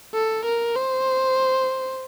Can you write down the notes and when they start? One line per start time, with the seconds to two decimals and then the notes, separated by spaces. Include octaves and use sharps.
0.14 A4
0.46 A#4
0.76 C5